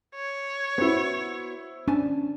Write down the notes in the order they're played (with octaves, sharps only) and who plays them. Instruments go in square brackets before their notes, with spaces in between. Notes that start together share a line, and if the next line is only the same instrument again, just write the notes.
[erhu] C#5
[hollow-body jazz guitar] B3 F#4 [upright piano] E4 C5
[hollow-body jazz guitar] C#4 G#5 A5 [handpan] D4